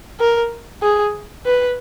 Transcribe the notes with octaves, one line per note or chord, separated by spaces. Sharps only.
A#4
G#4
B4